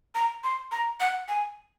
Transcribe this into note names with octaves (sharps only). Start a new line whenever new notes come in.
A#5
C6
A#5
F#5
G#5